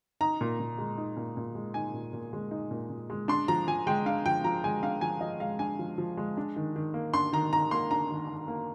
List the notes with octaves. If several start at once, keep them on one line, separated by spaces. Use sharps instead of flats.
D#4 A#5
A#2
A#2
G#3
D#4
A#2
A#2
G#3
D#4 G#5
A#2
A#2
G#3
D#4
A#2
A#2
G#3
D4 C6
F3 A#5
F3 G#5
G#3 G5
D4 F5
F3 G5
F3 A#5
G#3 G#5
D4 F5
F3 G#5
F3 D#5
G#3 F5
D4 G#5
F3
F3
G#3
D4
D#3
D#3
A#3
D4 C6
D#3 A#5
D#3 A#5
A#3 C6
D4 A#5
D#3
D#3
A#3